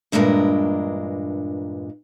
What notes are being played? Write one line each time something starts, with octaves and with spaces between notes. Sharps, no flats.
E2 G2 A#2 G#3 D4 A#4